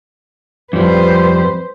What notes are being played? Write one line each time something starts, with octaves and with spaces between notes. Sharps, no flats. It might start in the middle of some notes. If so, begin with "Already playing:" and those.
F2 G3 B4 C5